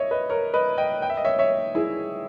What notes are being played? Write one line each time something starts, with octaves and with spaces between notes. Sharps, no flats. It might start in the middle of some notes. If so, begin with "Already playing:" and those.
Already playing: C#5 D#5 E5
B4 D#5
A#4 C#5
B4 D#5
D#5 G5
G5
E5
D#5
C#5 E5
C#5 E5
E4 G#4